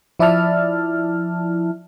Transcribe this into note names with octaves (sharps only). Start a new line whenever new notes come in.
F3 E4 D5 E5 A5 F6